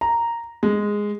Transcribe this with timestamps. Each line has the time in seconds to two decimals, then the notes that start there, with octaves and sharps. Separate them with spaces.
0.01 A#5
0.63 G#3